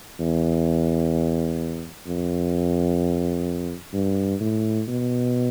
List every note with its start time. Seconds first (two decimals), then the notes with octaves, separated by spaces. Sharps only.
0.19 E2
2.06 F2
3.93 G2
4.40 A2
4.87 B2